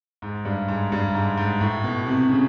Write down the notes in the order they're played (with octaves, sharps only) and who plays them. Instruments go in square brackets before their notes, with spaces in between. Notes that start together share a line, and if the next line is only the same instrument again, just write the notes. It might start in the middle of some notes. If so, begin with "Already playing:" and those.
[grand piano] G#2
G2
G#2
G2
G#2
G#2
A2
B2
C3
C#3